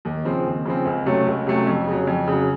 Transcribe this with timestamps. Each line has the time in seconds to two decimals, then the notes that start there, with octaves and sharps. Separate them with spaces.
0.05 D#2
0.25 C#3 F3 C4
0.46 D#2
0.65 C#3 F3 C4
0.85 C#2
1.06 C3 F#3 A3 C#4
1.26 C#2
1.46 C3 F#3 A3 C#4
1.67 F2
1.87 C#3 F#3
2.07 F2
2.27 C#3 F#3